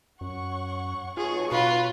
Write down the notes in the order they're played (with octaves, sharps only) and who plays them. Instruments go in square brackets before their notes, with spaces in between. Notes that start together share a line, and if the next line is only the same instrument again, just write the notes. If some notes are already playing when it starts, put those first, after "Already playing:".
[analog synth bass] F#2 [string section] C#5 F#5 C#6
[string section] B1 C#5 C#6 [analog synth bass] F4 [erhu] G#4
[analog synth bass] B2 [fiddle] F4 [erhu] B4